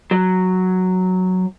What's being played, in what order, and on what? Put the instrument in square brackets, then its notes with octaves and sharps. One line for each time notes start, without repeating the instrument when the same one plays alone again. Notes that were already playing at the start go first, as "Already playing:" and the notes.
[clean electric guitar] F#3